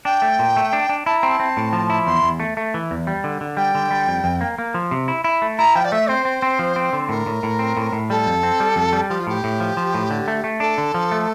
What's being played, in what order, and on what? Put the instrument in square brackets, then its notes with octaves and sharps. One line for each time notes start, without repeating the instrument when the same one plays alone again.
[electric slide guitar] D4 [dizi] G5
[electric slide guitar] A3
A#2
A3
D4
D4
[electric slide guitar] E4 [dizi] A5
[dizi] A#5
[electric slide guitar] C4
[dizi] A5
[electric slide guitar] C4
A2
F3
E4
[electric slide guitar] E2 [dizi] C6
[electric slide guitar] E2
A3
A3
E3
E2
G3
D3
D3
[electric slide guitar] G3 [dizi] G5
[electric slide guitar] D3
G3
F2
F2
A#3
A#3
F3
C3
E4
E4
A3
[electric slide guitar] E4 [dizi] A#5
[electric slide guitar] F3 [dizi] G5
[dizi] D5
[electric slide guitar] A3 [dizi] E5
[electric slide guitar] C4 [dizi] C5
[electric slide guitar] C4
C4
F3
C4
D3
[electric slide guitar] A2 [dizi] A#4
[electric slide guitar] A2
A2
C4
A2
A2
[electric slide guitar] G3 [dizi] A4
[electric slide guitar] F2
C4
G3
F2
G3
[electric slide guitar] F3 [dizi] G4
[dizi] F4
[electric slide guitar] A2 [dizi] G4
[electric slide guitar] A2
F3
F3
A2
D3
A3
A3
[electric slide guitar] D4 [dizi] A4
[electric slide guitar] D3
F3
A3